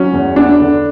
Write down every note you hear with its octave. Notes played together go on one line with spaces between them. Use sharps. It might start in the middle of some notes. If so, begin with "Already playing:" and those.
Already playing: F#3 C#4
E2
B3 D4
D3